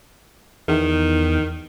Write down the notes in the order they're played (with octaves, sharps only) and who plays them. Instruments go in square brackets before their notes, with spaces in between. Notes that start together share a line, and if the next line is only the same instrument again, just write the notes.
[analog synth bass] E2 [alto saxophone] D#3